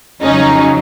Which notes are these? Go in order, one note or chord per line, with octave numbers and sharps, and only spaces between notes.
F2 C#3 F#3 C#4 D#4